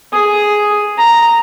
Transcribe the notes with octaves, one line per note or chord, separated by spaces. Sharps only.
G#4
A#5